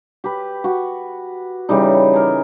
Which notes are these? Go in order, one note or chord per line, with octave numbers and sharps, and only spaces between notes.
G4 B4
F#4 C#6
C#3 E3 G3 D#4
G#4 A#4